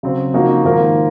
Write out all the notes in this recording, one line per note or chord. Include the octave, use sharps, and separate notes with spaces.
C#3 F#3 C4
C#3 F3 A#3 D#4 F#4
G#2 D#3 A#3 F4 A#4